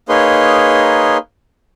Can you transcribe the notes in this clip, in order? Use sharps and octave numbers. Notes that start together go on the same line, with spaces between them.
A#3 D#4 G#4 B4 C#5 C6